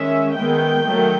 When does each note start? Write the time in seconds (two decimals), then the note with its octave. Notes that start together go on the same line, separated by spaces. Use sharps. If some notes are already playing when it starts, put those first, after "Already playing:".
Already playing: D#3 G#3 C#4 E5
0.37 D#3 G#3 B3 G5
0.85 D#3 F#3 A3